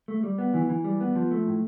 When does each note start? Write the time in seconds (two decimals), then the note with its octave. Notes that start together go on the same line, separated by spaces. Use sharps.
0.08 A3
0.24 G3
0.38 B3
0.54 E3
0.69 E3
0.84 G3
1.01 B3
1.15 F3
1.31 A3
1.47 A2